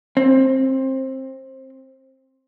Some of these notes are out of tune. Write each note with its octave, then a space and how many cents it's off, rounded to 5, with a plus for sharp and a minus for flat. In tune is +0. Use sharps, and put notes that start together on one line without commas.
C4 +20